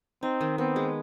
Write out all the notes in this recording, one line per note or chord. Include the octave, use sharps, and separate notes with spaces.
C4 D#4
D#3
B3 C4
G#3